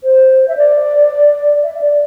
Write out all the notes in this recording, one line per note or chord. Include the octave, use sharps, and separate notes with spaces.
C5
E5
D5
E5
E5
D5